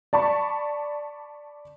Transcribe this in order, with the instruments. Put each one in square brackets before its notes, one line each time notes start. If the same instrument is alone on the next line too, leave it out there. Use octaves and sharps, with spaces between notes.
[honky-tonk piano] D5 A5 B5 C#6